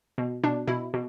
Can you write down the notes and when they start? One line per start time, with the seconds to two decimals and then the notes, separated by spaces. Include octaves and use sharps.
0.18 B2
0.44 B2 D4
0.68 B2 E4
0.94 B2